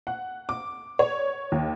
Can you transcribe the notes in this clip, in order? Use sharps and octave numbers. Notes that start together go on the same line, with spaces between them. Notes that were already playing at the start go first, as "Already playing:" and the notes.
F#5
D6
C#5
D#2